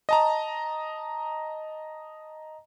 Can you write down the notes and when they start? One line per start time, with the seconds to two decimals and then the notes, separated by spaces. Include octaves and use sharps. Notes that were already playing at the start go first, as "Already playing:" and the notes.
0.09 D#5 A5 A#5